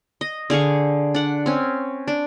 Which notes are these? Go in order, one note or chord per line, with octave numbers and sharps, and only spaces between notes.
D#5
D3 G#4 F5 C#6
D4 F#5
C4 C#4
D4